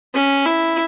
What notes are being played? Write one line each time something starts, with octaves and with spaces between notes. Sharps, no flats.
C#4
E4